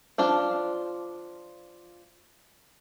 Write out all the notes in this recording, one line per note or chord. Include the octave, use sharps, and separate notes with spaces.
F3 D4 F4